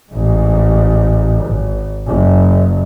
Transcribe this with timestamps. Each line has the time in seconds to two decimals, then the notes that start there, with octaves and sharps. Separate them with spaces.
0.12 A1 G#2
1.44 G#1
2.08 F#1